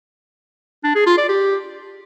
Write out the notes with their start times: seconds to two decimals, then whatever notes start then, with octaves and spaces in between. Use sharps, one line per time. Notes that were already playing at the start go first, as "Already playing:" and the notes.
0.84 D4
0.95 G#4
1.06 F4
1.18 D5
1.29 G4